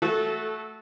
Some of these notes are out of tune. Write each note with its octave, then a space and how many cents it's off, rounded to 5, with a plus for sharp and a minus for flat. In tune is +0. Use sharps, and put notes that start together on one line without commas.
A3 +0 F#4 +0 A4 -20